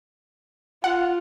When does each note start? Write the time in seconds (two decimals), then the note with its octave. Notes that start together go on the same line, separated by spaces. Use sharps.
0.84 F4 F#5